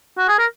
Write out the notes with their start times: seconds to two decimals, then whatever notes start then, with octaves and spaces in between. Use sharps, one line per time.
0.18 F#4
0.28 G#4
0.38 A#4